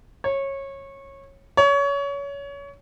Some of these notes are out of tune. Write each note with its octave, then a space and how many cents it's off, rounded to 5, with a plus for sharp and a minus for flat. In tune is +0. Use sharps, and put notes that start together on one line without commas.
C#5 -20
C#5 +25